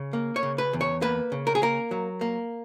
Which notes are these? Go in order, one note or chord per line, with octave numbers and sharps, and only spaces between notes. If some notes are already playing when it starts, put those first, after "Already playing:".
Already playing: C#3
A#3
C#5
C#3
B4
E2
C#5
A#3 B4
C#3
A#4
G#4
A#3 A#4
F#3
A#3